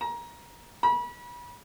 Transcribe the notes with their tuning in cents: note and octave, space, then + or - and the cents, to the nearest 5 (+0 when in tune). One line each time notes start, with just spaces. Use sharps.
A#5 +25
B5 -35